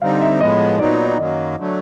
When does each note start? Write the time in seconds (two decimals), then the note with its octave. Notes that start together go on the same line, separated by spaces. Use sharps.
0.02 D3 G3 C4 D#4 F5
0.21 E5
0.40 A2 F3 G#3 B3 D#5
0.79 A#2 F#3 B3 D#4 D5
1.07 D5
1.17 F#2 D#3 F#3 A#3 D#5
1.58 D3 F#3 A3